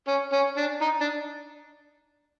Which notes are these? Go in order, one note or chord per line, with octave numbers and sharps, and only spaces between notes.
C#4
C#4
D4
D#4
D4